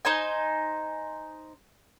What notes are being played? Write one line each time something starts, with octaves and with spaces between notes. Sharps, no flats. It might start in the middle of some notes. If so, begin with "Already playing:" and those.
D#4 C5 G#5